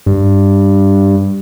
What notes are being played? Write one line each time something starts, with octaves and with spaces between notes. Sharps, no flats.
G2